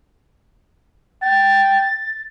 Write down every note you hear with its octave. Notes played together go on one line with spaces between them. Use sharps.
G5 A6